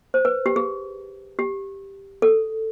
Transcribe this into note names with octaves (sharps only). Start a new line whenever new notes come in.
C5
B4
G4
G#4
G4
A4